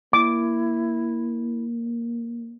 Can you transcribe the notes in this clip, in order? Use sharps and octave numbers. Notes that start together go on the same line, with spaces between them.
A#3 E4 D6